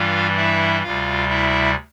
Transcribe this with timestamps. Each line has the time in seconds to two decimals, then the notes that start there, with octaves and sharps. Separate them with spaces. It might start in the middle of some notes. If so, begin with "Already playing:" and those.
Already playing: G2 E3 G3 F4 F5
0.36 E4 E5
0.83 D2 C3 G3 F4 F5
1.29 E4 E5